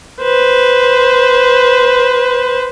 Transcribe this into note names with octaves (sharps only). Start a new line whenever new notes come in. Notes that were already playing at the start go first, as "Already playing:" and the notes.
B4 C5